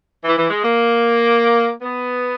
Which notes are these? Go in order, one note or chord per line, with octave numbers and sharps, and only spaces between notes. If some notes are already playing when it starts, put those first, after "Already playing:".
E3
E3
G#3
A#3
B3